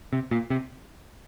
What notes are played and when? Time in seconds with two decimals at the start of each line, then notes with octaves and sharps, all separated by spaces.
0.13 C3
0.31 A#2
0.50 C3